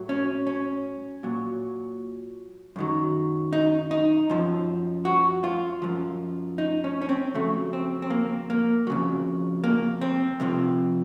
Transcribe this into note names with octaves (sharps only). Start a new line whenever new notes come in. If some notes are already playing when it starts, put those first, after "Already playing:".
Already playing: A2 F#3
C#4
C#4
A#2 F#3
F#2 D#3 F#3
D#4
D#4
F#2 F3
F#4
F4
F#2 F3
D#4
C#4
C#4
C4
F2 C#3 F#3 A3
C4
C4
A#3
A#3
F2 C#3 F#3
A#3
C4
F2 C3 F3